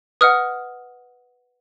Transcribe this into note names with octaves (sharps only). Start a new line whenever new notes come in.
B4 D#5 F#5 D#6 F6